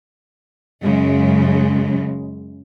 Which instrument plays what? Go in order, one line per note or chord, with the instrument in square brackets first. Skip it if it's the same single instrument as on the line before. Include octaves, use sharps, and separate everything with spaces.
[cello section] F#2 C#3 G#3